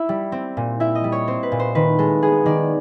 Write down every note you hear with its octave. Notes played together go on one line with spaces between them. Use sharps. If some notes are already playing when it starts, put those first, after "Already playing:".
Already playing: E4 E5
G3
C4
A#2
E4 E5
D#5
G3
C#5
C4 C5
B4
A#2
C5
D#3 B4
G#3 A4
B3 G#4
D#3 D5